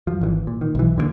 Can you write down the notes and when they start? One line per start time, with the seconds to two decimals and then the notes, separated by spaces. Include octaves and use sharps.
0.07 F#2 F3
0.21 G#1 D3 E3
0.47 A#2
0.61 D#3
0.75 B1 E3
0.96 F2 D3 D#3 A#3